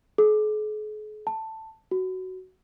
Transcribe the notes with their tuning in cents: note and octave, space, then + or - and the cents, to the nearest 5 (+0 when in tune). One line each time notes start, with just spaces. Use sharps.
G#4 +45
A5 +10
F#4 +10